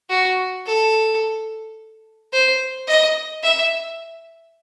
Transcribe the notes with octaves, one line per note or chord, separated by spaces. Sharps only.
F#4
A4
C5
D#5
E5